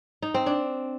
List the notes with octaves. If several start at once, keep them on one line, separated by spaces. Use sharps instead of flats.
D#4
C4
D4